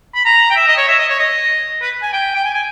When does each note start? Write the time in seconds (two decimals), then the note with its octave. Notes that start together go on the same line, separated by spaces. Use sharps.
0.14 B5
0.25 A#5
0.50 G5
0.56 E5
0.67 D#5
0.77 C#5
0.88 E5
0.98 D#5
1.09 C#5
1.19 D#5
1.82 B4
2.02 G#5
2.13 G5
2.35 G5
2.44 G#5
2.55 G#5